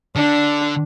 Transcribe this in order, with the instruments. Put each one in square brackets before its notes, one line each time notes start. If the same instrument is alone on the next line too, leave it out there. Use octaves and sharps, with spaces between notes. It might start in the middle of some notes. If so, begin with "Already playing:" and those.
[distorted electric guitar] D3 [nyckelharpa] D4